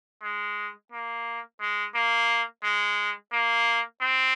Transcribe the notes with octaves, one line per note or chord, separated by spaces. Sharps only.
G#3
A#3
G#3
A#3
G#3
A#3
C4